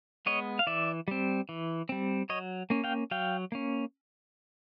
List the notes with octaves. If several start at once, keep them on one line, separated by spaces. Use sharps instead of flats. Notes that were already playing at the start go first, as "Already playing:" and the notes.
G#3 B3 C#5 D#5
F5
E3 D5 E5
G3 C4
E3
G3 C4
F#3 C#5 D#5
A#3 C#4
F5 G5
F#3 F5 G5
A#3 C#4